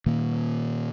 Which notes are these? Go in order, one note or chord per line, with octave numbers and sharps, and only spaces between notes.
A#2 D#3 A#3